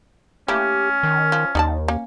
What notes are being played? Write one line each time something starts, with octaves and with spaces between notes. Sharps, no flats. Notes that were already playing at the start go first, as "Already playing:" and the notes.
A3 A#3 C#4 E4 G4
D#3
F3
D#2 D#4 D5 A5
A#3 C#4